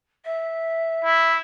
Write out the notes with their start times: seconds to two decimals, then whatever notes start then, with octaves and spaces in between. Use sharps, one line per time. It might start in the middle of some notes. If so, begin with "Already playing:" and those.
0.25 E5
1.04 E4